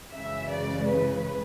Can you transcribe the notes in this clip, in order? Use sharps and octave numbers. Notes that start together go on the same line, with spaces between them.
F#2 C#3 E3 G#3 E5
D5
B4